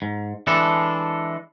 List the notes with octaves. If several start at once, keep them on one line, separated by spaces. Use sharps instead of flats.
G#2
E3 G#3 D4 A4